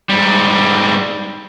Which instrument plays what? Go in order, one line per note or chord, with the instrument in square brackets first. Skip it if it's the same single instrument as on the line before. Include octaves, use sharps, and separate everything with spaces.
[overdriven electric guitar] G#2 G3